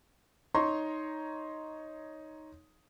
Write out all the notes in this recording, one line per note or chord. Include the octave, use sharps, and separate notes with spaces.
D#4 C#5 A#5 C6 C#6